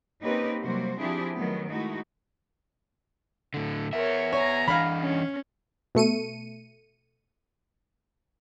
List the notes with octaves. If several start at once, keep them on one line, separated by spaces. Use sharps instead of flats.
A#3 C4 C#4 D#4 G4 B4
C3 F#3 G3 A#3 F#4 C5
F3 C4 D4 E4 G4 G#4
D#3 F#3 A3 B3
G#3 A3 D#4 E4 F#4
A2 D3
B3 A#4 C#5 E5
C#5 G#5 A#5
E3 D4 F5 B5
C#4
B2 A3 C#7 D#7